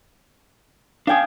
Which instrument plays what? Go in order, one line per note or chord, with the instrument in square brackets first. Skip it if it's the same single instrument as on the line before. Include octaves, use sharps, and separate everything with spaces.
[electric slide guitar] D4 G#5 [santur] F5 G5 D#6